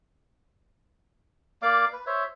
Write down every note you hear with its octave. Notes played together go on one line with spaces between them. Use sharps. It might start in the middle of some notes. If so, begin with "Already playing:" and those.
A#3 D5 F5 D6
B4
C5 C#5 E5